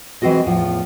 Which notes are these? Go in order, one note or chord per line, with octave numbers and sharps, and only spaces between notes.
E3 G#3 C4 F#4 D#5
E2 A2 F3